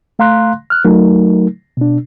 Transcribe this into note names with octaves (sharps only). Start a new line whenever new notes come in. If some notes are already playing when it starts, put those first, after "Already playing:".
A3 F5 A#5 C6 F#6
F6 F#6
F#3 A3 D#4 A#4
B2 D4